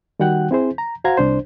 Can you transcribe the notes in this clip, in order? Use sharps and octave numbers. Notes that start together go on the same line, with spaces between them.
D#3 G3 F#4 F#5 G5 F#6
C4 E4 G#4 C5
A#5
F#4 C5 F5 F#5 A#5 G#6
C2 D4 C5